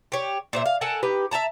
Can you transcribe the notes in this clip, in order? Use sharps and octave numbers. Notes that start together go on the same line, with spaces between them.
G4 C#5
A#2 C5 E5
F5
A4 A#4 F#5 G#5
D#4 G4 B4
E5 G5 A5 A#5